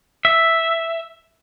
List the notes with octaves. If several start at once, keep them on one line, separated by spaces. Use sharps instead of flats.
E5